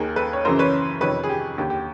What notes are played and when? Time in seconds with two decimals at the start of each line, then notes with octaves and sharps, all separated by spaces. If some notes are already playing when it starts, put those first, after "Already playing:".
Already playing: D#2 D#3 G#4 A#4
0.16 A4 B4
0.33 C#5
0.45 F#2 C#3 E3 A#4 C5
0.59 B4 C#5
1.01 F2 C3 D#3 B4 C#5
1.24 G#4
1.29 G4
1.58 D#2 D3 G4
1.70 G4